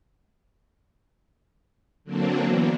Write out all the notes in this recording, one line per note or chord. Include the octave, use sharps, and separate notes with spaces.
D3 F#3 A#3 C4 D4
E3 A#3 B3